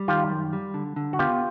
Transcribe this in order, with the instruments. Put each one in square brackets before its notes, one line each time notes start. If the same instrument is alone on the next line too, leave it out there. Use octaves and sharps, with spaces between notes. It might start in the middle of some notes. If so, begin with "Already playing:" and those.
Already playing: [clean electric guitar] G3
[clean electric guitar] D#3 [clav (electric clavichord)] F4 G4
[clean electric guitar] F#2
G3
D3
D3
[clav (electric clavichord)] F#4
[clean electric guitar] B3 [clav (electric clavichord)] F4 G4